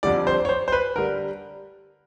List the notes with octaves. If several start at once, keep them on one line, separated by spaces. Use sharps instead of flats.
F2 D3 G3 D5
C5
C#5
C5
C5
B4
D3 G3 A#4